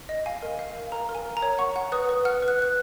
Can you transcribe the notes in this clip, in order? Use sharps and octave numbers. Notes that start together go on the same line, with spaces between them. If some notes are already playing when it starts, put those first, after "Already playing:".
D#5
F5 G#5
A#4
F5
F5
A#4 A#5
A#4
G#5
A#4
A#5
C#5
F#5 C#6
F#5
B4 D#6
B4
F#5 F6
B4
F#6
B4 F#6